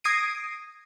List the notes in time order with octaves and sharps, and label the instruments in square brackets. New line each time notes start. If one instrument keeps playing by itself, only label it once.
[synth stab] D#6 G#6 A#6 C7 D7 D#7